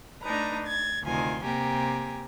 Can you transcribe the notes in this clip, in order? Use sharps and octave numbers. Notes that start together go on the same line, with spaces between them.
A3 D4 D#4 B4 A#5
G#6 A6
D2 C3 D#3 F4 G#5
C3 A#3 G4 G#5 A#5